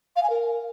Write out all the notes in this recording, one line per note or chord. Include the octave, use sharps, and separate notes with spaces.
F5
G#5
A#4